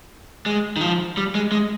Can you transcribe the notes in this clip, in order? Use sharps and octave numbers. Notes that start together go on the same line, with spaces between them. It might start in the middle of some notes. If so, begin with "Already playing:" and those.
G#3
D#3
F3
G3
G#3
G#3